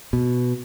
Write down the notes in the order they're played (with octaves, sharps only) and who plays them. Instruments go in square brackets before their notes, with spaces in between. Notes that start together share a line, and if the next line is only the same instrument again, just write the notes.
[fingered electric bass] B2